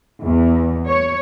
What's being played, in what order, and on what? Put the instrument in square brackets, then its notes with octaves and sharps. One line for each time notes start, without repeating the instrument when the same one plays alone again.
[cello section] E2
C#5